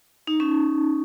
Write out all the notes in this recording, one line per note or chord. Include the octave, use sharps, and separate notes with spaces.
D#4
C#4